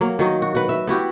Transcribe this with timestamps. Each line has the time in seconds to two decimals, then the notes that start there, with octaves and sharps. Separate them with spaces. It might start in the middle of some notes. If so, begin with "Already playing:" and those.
0.01 F#3 A#3
0.19 D#3 F#3 D#5
0.42 F#4
0.55 F#4 B4
0.69 E5
0.87 B3 E4 F#4 G4